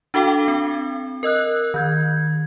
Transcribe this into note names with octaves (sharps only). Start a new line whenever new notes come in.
D4 F#4 A4 F5 G5 D6
C4
A#4 D#5 E6 F#6
D#3 G6 G#6